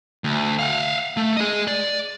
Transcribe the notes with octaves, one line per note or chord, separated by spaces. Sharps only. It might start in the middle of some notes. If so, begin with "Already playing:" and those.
D2
F5 F#5
A3
G#4 D#5
D5